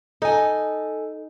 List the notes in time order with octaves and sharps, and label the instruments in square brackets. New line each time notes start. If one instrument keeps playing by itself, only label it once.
[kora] D#4 [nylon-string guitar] A4 G#5